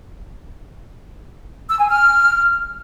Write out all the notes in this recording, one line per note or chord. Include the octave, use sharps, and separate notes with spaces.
E6
G#5
F6